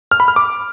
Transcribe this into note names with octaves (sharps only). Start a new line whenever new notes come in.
F6
B5
F6
D6